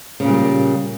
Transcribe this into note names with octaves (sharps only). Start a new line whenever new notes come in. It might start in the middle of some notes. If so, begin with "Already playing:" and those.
A#2 C#3 G3 A#3